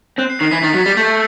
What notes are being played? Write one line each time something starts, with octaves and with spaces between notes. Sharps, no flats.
C4 F#6
C7
D#3 C7
E3 B6
D#3 A6
F#3 B6
G3 A6
A3 G6